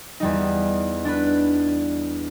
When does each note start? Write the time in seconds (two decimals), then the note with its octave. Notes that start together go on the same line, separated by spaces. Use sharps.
0.20 E2 G3 D#4
1.05 D4 B4